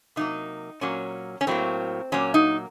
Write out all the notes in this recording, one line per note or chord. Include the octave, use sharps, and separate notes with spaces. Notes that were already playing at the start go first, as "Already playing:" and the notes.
C3 F#3 A#3 D#4
A#2 F#3 A#3 C#4
C#4
A2 F#3 A#3 C4
A#2 F#3 A#3 C#4
D#4